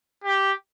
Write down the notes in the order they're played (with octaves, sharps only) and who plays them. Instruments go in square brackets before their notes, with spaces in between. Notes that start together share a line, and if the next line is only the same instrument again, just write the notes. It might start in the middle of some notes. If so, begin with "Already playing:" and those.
[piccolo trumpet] G4